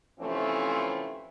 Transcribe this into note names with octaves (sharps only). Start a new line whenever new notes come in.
C3 E3 F3 A3 C4 C#4